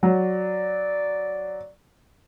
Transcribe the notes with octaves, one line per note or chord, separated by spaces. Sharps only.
F#3 D5